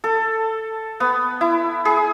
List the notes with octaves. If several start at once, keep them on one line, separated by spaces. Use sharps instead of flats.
A4
B3
E4
G#4